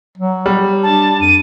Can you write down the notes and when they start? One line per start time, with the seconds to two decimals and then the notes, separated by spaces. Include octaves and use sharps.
0.18 F#3
0.46 G3
0.83 D4 A5
1.21 F2 D#7